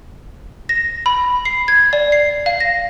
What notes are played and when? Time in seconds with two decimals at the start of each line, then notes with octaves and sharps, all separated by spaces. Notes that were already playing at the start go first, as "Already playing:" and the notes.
0.69 A#6
1.06 B5
1.45 C7
1.68 G#6
1.93 D5
2.12 C7
2.46 F5
2.60 A#6